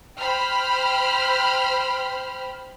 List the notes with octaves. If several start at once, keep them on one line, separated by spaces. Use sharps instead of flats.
C5 G5 B5 F6